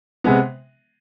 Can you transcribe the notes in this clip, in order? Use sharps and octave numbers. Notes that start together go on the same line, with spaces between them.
C3 G#3 B3